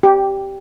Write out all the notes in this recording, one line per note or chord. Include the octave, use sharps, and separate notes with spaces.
G4